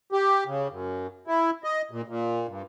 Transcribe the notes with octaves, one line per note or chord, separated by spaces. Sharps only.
G4
C#3
F#2
E4
D#5
A#2
A#2
G2